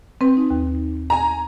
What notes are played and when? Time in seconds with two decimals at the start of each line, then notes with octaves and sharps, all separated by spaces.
0.21 C4 B4
0.37 D#4
0.50 D#2
1.10 G#5 A#5